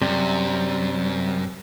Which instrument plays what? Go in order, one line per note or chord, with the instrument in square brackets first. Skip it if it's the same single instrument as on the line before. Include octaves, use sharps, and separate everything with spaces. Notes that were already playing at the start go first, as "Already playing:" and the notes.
[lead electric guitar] F#2 [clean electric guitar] C3 G3